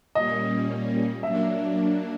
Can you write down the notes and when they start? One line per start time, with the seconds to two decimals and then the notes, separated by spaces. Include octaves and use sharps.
0.15 A#2 G3 A#3 C#4 D#5
1.22 F#3 A#3 D4 E5